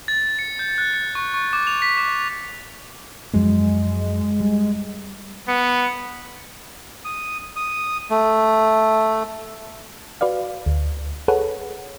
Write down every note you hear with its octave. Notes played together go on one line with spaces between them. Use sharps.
A6
C#7
G6
F#6
C#7
C#6
C#6
D6
F7
B6
D6
F#2 F3 F#3 G#3
G3
B3 C#7
D#6
D#6
A3
F#4 B4 D5 F5
D2
G#4 A4 B4 C#5 F#5